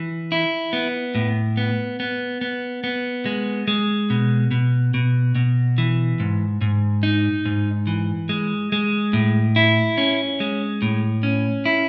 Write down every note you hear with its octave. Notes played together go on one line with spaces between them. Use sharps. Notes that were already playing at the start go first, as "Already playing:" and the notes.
Already playing: E3
E4
B3
A2
B3
B3
B3
B3
G#3
G#3
B2
B2
B2
B2
E3
G#2
G#2
D#4
G#2
E3
G#3
G#3
A2
E4
C#4
G#3
A2
C#4
E4